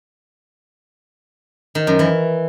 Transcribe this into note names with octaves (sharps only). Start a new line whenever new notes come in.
D#3
F#2
E3